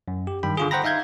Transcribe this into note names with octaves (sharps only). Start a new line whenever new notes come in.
F#2
G4
G2 D#3 G5 B5
D3 F4 G#4
C5 F#5 G5 A#5 B5 A#6
D#4 E5 F5 G6 G#6